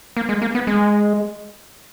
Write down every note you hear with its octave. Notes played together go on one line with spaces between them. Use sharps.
A#3
G#3
A#3
B3
G#3